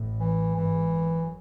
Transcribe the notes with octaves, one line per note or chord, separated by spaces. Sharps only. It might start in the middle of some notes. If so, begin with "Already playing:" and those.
Already playing: A1 A2
E3
G#1 G#2 E3
F#2